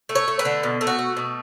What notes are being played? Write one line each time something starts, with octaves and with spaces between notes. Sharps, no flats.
A3
C#5
A3
B4
D3
B2
A3
F#4
A3
B2